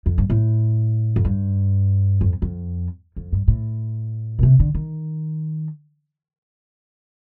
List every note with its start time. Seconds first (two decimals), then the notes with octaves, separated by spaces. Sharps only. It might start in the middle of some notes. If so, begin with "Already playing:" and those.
0.06 F2
0.18 G2
0.30 A2
1.16 F2
1.25 G2
2.21 F2
2.42 F2
3.16 F2
3.32 G2
3.48 A2
4.39 A#2
4.43 C3
4.60 D3
4.74 D#3